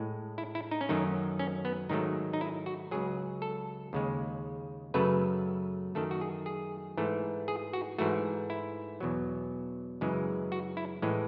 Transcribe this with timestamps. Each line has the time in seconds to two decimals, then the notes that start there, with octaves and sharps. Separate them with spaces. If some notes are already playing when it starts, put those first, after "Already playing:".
Already playing: A2 G#3
0.38 E4
0.55 E4
0.71 D#4
0.81 C#4
0.89 F#2 D#3 F#3 A3 D#4
1.39 C#4
1.65 B3
1.89 G#2 D#3 F#3 A3 D#4
2.33 D#4
2.41 E4
2.66 F#4
2.91 C#2 C#3 F#3 G#4
3.42 A4
3.93 D#2 C#3 G#3
4.94 F#2 C#3 F#3 A3 B4
5.95 F#2 D#3 A3 A4
6.11 F#4
6.21 G#4
6.46 G#4
6.97 G#2 E3 A3
7.48 G#4
7.73 F#4
7.98 G#2 E3 A3 F#4
8.50 E4
9.00 E2 B2 F#3
10.01 F#2 C#3 E3 G#3
10.52 F#4
10.77 E4
11.02 A2 E3 G#3